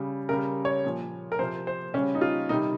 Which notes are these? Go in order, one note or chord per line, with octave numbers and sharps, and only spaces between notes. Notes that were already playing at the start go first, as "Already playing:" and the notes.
Already playing: C#3 G3
C#3 G3 A#4
C#5
A#2 F3
A#4
C3 F3 C5
C5
C#3 G3 C#4
D#4
F4
C3 D#3 G3 D#4